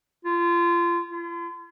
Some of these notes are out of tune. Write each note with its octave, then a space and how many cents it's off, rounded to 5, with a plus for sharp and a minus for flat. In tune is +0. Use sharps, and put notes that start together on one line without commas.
F4 -25
F4 -45